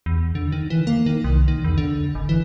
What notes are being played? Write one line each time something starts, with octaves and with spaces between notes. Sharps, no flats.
E2
D3
D#3
E3
A#3
D#3
C2
D#3
E2
D3
G#1
E3